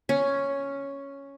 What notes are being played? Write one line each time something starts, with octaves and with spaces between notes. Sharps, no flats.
C#4